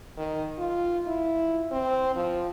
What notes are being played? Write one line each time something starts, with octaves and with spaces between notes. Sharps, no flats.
D#3
F4
E4
C4
F3